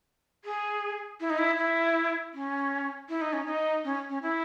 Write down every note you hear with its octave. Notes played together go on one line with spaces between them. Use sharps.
G#4
E4
D#4
E4
E4
C#4
E4
D#4
C#4
D#4
C#4
C#4
E4